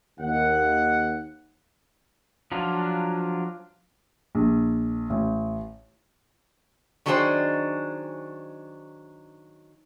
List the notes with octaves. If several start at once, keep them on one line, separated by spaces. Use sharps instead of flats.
D#2 F#5
F3 F#3 D4 F4
A#1
A1
D#3 F#3 D4 G#4 C5 G5